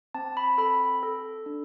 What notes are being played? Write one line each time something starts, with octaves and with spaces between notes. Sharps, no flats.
C4 A5
B5
A4 B5
A4
D4